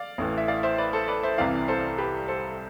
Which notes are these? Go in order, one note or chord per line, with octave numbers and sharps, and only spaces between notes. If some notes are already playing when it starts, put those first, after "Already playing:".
Already playing: D5 F5
A1 A2 E3
E5
D5 F5
C5 E5
B4 D5
A4 C5
B4 D5
C5 E5
C2 C3 E3 D5 F5
A4 C5
G4 B4
A4 C5